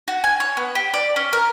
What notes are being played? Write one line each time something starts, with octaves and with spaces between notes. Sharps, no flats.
F#4
G#5
C#5
B3
G4
D5
C#4
A#4